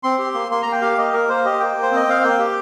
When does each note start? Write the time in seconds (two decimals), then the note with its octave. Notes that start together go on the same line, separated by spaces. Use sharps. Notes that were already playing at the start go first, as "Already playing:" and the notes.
0.03 C4 C6
0.18 G4
0.34 A#3
0.50 A#3 C6
0.62 A#3 A#5
0.72 G5
0.81 G4 F5
0.98 A#3 D#5
1.13 A#3 A#4
1.29 A#3 C5
1.45 G4 D#5
1.60 A#3 G5
1.77 A#3
1.83 C5
1.91 C4 D#5
2.08 C4 F5
2.23 A#3 G5
2.39 G4